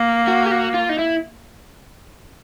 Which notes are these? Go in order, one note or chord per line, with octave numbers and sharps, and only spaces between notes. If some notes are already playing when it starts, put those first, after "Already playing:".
Already playing: A#3
F#4
G4
F#4
F4
D#4
E4